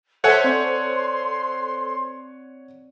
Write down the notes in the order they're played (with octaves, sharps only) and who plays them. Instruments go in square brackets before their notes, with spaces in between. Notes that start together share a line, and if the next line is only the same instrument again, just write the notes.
[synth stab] A4 C5 [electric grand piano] C#5 F#5 G#5 [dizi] E5
[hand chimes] C4 D5 [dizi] C6